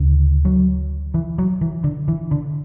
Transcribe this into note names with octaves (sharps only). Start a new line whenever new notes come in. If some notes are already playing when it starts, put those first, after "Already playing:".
Already playing: D2 C#3
F#3
E3
F#3
E3
D3
E3
D3